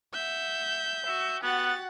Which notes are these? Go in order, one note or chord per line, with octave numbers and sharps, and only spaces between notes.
E5 F#5 G6
F#4 E5
B3 F#4 G4 F#5 A6